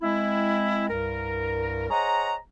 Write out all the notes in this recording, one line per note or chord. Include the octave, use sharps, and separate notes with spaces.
G#3 C4 E4
C2 G2 A#4
G#4 C5 C#5 D#5 F#5 A#5